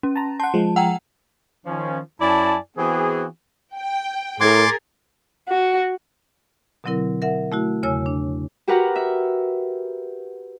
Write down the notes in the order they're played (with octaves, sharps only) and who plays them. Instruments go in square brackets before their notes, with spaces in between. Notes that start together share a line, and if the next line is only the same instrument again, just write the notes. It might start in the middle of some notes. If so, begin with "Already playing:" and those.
[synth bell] C#4
[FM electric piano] A5 A#5
[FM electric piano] F#5 C6 [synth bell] A5
[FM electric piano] F3 G#3
[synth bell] F#5 G5 A#5
[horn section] D#3 F3 C#4
F#2 E4 D5 G#5 A5
E3 B3 C4 F#4 G#4
[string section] G5
[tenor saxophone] A2 [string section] G#4 A#4 [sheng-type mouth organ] C6 D6 [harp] G#6 A6
[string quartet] F#4
[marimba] B2 D3 F#3 C4 E4 A#4
A#4 E5 F#5
A3 E4 F#4
E2 C#3 C#5 G#5 E6
D4
[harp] F#4 G4 A#4 B4 F#5 A#5
E5